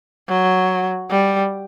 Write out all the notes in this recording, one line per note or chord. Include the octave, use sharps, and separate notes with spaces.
F#3
G3